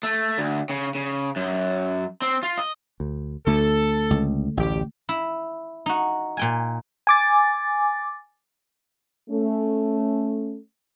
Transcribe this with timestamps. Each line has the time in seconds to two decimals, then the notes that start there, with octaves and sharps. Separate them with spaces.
0.03 A3
0.38 D2
0.69 C#3
0.95 C#3
1.36 F#2
2.22 C4
2.43 F4
2.58 D#5
3.00 D2
3.46 D2 D3 A3 A4
4.10 C#2
4.57 A1 D2 G3 D4 G4
5.09 E4
5.86 D#4 F#4
6.37 A#2 G5 G#5
7.07 G#5 D6 A6
9.30 A3 C#4